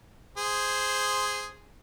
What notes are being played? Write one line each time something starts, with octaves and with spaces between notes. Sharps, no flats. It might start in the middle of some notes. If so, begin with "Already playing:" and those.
G#4 C5